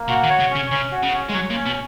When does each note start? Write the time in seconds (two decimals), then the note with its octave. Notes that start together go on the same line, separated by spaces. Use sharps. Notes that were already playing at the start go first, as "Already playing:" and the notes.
Already playing: A#3
0.08 A#2 F#4
0.24 D#3
0.30 C#5
0.40 C#3
0.51 C#3 C#4
0.71 C#3 C#4
0.92 F#4
1.03 C#3
1.13 C#4
1.29 G#3
1.34 F#3 C#5
1.50 A#2
1.55 C#4
1.66 B2